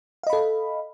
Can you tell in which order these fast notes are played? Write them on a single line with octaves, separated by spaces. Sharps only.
F5 D#5 B5 A4